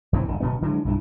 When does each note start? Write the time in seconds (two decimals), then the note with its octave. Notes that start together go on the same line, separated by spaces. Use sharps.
0.13 D#2 E3 C4
0.28 G1 D3
0.40 D1 B2 B3
0.62 D3 E3 F#3 G#3
0.85 B1 G2 E3